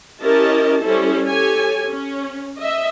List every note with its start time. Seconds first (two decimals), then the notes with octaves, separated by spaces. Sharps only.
0.22 C#4 E4 G4 A#4 D#5 A5
0.83 G3 C#4 E4 A4 C5
1.25 G4 A4 C#5 G#5
1.88 C#4
2.59 D#5 E5